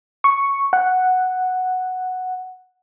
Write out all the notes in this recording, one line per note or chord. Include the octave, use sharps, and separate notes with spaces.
C#6
F#5